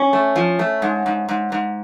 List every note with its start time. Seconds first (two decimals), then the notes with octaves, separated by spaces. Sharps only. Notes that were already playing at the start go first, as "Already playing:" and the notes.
Already playing: C#4
0.13 A3
0.36 F3
0.59 A3
0.82 G#2
1.06 G#2
1.29 G#2
1.52 G#2